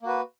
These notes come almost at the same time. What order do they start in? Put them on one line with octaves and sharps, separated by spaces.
A#3 F#4 B4